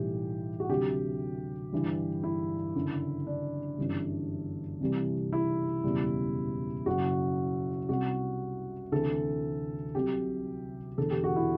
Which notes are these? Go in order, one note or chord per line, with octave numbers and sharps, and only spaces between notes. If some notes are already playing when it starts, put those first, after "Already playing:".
Already playing: B1 A2 E3 G3 G4
F#4
D2 C3 F#3 G4
G1 G2 E3 G3
E4
F#1 F#2 D3
D4
G1 F#2 E3 G3
C2 C3 E3 G3
E4
F#1 E2 B2 G3
F#1 F#2 F#3 F#4
C2 C3 G3 F#4
D2 C3 E3 A4
C2 C3 F#3 G4
E1 E2 D3 A4
G4
F#4
E4